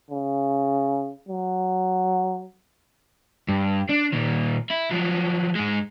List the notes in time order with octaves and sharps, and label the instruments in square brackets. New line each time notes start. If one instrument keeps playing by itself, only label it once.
[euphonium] C#3
F#3
[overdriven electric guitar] G2
D4
A#2 D#3
E4
F3 F#3
G#2 G#3